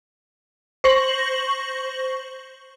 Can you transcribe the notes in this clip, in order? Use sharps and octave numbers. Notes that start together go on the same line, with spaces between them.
C5 C#6 A#6 F#7